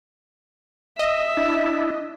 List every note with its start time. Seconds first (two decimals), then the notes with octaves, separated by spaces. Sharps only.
0.99 D#5 E5
1.37 D4 E4